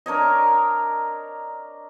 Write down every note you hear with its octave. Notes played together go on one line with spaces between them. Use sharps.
D4 A#4 C#5 D#5